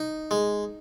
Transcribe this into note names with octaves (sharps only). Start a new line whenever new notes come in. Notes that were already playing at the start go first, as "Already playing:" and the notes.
Already playing: D#4
G#3